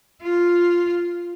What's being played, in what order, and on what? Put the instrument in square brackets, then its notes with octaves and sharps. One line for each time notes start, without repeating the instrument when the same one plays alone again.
[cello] F4